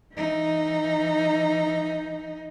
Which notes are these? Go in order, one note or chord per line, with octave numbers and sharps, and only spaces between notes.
E3 D#4